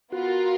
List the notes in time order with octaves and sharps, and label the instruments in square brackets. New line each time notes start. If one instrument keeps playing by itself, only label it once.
[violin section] B3 F4 A#4 [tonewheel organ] F#4